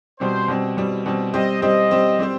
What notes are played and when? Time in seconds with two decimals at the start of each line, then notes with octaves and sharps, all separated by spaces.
0.20 B2 G3 C4 C5
0.48 B2 G3 C4
0.77 B2 G3 C4
1.06 B2 G3 C4
1.33 G3 C4 G4 C5 D#5
1.62 G3 C4 G4 C5 D#5
1.91 G3 C4 G4 C5
2.19 G3 C4 G4 C5